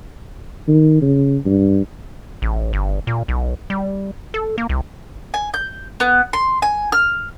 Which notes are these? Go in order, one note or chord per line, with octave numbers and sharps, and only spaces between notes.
D#3
C#3
G2
A1
G1
A#2
B1
G3
A4
A#3
C2
G#5
G6
B3
C6
G#5
F6